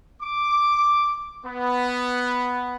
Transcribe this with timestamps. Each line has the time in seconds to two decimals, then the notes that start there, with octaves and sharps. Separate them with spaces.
0.21 D6
1.45 B3